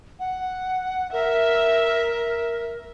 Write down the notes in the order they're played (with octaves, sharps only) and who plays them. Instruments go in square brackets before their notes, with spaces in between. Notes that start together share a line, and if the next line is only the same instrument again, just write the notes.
[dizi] F#5
[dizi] A#4 [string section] E5